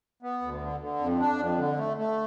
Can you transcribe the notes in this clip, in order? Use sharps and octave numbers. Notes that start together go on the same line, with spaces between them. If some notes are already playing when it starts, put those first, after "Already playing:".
B3
D2
D3
D3
F2
D4
F2
D3
A3
A3